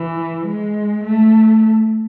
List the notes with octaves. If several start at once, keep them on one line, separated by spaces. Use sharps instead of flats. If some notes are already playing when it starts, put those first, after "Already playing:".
Already playing: E3
G#3
A3